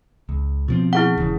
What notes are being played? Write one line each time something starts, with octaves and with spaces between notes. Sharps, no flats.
C#2
B2 F3 C4
E4 G#4 F#5
E1 C#3